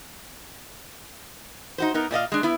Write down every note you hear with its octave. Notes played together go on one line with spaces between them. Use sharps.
D#4 F#4 C5
B3 D#4 A#4
A#2 D5 D#5 F5
G#3 D4
B3 E4